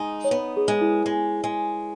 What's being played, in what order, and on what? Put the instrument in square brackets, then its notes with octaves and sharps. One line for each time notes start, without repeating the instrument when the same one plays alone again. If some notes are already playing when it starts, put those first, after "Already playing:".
Already playing: [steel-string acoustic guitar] G#3 D#4
[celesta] C#5
[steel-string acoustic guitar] B3 [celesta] B4
[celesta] G#4
[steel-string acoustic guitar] G#3
[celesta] E4
[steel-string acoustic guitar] G#3
G#3